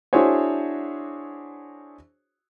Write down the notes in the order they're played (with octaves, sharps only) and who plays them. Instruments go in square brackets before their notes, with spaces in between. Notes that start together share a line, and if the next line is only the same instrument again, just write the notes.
[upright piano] D4 E4 F#4 G#4 C5 C#5